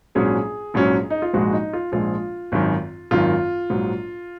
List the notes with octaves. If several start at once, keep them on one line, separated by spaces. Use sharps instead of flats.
A#1 G#2 F#3 C#4 G#4
A#1 G#2 F#3 C#4
D#4
F4
A#1 G#2 F3 G#3 F#4
D#4
F4
A#1 G#2 F3 G#3 F4
G#1 F#2 D#3
G#1 F#2 D#3 F4
A#1 G#2 F#3